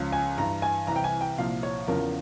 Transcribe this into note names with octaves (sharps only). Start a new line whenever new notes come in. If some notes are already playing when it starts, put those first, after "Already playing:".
Already playing: C#2 C#3 F3
G#5
G2 E3 A#5
G#5
C2 C3 E3 A#5
G5
G#5
G5
C2 A#2 F3 F5
C#5
E2 C#3 F3 A#4